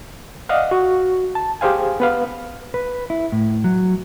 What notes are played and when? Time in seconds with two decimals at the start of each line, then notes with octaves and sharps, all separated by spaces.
0.49 D5 D#5 F5 F#5
0.71 F#4
1.35 A5
1.61 G4 G#4 C5 F5 G#5
2.00 B3 B4 F5
2.74 B4
3.10 E4
3.32 A2
3.64 F#3